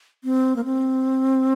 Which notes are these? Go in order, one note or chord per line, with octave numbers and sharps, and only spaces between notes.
C4
A#3
C4